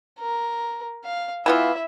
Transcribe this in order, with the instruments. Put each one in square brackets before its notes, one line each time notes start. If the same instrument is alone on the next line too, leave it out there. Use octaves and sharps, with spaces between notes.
[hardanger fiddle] A#4
F5
[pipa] E3 B3 F4 [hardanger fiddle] E4 E5